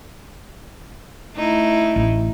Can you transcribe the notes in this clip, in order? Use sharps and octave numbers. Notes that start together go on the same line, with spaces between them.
A3 D#4 E4
A1